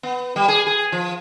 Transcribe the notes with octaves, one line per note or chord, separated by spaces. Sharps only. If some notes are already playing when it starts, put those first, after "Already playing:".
B3
G3
G#4
G#4
F3